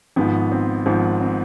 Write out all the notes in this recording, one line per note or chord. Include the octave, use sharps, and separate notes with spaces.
G#1 G#2 F3 B3
C4
G#1 G#2 F3
C4